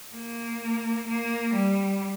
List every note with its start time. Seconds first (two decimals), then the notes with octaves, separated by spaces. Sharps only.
0.15 A#3
1.08 A#3
1.54 G3